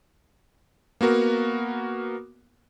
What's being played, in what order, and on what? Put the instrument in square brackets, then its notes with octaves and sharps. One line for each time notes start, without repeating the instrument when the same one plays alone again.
[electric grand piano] A#3 B3 F#4 A#4